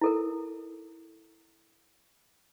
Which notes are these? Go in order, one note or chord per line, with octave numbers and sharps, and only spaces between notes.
E4 A4 A#4